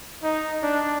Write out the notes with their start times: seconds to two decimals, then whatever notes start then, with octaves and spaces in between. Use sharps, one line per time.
0.23 D#4
0.63 D4